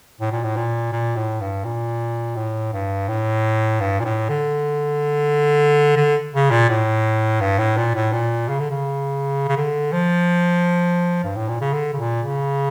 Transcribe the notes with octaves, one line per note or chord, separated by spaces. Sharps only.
A2
A#2
A2
A#2
A#2
A2
G2
A#2
A2
G2
A2
G2
A#2
A2
D3
D3
C#3
A#2
A2
G2
A2
A#2
A2
A#2
C#3
D3
C#3
C#3
D3
F3
G2
A2
A#2
C#3
D3
C#3
A#2
C#3